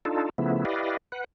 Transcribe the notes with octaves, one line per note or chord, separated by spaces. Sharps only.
D4 D#4 F4 A4
C#3 F3 A3 B3 E4
E4 G4 B4 D5 D#5 F5
B4 F#5